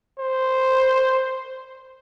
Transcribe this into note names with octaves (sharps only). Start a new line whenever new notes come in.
C5